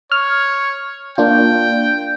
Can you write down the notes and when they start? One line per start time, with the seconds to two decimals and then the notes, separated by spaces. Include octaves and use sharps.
0.12 C#5 F6
1.18 A#3 D4 F4 G5